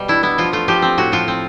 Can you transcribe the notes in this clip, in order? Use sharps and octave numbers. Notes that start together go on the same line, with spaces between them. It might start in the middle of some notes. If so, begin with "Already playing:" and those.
Already playing: B2 G3
D4 E4
B3 E4
F3 F4
A3 F4
F3 G4
C4
A2 F#4
F3 F4
C4